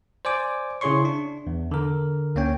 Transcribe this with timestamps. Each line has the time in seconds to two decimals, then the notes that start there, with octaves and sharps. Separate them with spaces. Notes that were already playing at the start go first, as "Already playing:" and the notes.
0.25 C5 D5 G#5 D6
0.81 C#3 E4 G#4 C#5 C6 C#6
1.05 D4
1.47 E2
1.71 D3 A#4
2.35 D2 A#3 C#4 C#5 G5